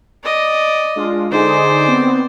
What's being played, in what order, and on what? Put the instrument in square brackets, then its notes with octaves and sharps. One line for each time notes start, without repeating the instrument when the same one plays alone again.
[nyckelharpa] D5 D#5
[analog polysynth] G#3 D4 F4
[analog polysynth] D3 D#4 G#4 [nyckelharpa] C5 D5
[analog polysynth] B3 C4